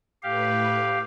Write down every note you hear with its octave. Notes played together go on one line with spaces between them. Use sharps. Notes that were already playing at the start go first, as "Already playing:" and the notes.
A2 G4 B4 F5